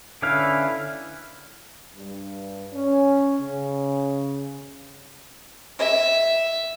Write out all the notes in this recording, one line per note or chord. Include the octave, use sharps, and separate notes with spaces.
D3 C#4 E4 B4 F5
G2
C#4
C#3
E5